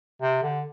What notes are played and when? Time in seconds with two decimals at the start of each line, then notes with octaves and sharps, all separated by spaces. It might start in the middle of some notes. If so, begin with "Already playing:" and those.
0.21 C3
0.42 D3